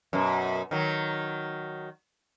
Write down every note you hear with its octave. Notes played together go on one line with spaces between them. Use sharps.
F#2 B2
D#3 F#3